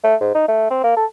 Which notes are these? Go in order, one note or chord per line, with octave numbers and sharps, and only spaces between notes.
A3
G#2
D#4
A3
C4
A#3
A4